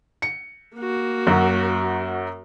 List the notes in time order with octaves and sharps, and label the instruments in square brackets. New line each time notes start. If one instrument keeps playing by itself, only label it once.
[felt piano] C#7
[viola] A#3 F#4
[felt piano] F#2 F#3